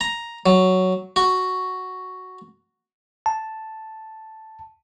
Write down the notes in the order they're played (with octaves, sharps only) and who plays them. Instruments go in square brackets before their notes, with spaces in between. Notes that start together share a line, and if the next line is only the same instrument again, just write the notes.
[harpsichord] A#5
F#3
F#4
[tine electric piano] A5